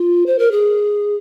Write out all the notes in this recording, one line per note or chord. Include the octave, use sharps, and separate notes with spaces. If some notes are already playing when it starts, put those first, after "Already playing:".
Already playing: F4
C5
A#4
G#4